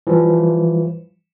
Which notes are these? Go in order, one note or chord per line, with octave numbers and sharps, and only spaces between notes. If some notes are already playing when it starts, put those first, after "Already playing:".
E3 F3 G3